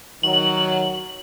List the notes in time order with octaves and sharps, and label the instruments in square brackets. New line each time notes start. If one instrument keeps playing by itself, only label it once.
[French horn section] D#3 F#3 [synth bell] F#7